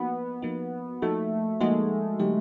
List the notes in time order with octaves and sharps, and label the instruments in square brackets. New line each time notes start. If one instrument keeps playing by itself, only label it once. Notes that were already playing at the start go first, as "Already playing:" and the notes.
Already playing: [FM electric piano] F3 A#3 D#4 F#4 [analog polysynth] B3
[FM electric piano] F3 A#3 D#4 F#4
[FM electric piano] F3 A#3 D#4 F#4 [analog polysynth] A3
[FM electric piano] F3 A#3 D#4 F#4 [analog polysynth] G#3
[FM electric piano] D3 F#3 A#3 D#4 G4